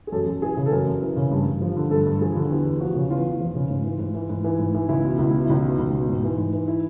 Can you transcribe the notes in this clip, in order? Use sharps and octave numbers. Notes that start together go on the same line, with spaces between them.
G#4
F#2 A4
F#2
E3 G#4
C#3
A4
F#2 A#4
F#2
E3
C#3
G2
G2
F3
D3
G2 A4
G2
F3 G#4
D3
E2 G4
E2
F3 F#4
C#3
E2 F4
E2
F3
C#3
G#2
E3
G#2
E3
G#2
E3
G#2
E3
C#2 E4
B2
C#2 E4
B2
E4
C#2 D#4
B2
C#2
B2
G#2
E3
G#2
E3
E4